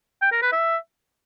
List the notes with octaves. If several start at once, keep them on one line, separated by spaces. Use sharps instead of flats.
G5
A#4
B4
E5